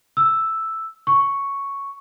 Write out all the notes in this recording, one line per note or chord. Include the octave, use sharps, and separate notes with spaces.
E6
C#6